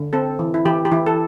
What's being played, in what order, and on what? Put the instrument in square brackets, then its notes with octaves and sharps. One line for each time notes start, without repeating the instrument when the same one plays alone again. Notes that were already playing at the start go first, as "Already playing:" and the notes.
Already playing: [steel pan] D3
C4 A4
E3
E4
E3 G4
G4
E3 E4
A4